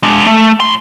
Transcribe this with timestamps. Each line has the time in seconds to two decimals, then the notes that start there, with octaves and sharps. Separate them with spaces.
0.03 G#3 D4
0.27 A3
0.60 A2 C6